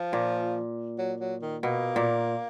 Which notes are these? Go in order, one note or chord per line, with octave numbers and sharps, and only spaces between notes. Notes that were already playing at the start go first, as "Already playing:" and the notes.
Already playing: F3
A#2
F#3
F#3
D#3
B2 A#3
A#2